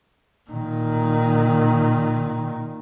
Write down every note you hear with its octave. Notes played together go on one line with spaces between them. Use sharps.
A#2 D#3